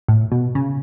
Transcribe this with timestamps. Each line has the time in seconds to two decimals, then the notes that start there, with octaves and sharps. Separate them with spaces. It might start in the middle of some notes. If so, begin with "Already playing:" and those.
0.08 A2
0.32 B2
0.55 C#3